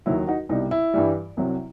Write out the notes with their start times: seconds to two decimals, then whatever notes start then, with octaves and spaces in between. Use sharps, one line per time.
0.06 D#2 D#3 F#3 E4
0.27 D#4 F#4
0.49 C2 B2 G3 D#4
0.71 E4
0.94 G2 E3 G3
1.37 C2 C3 F#3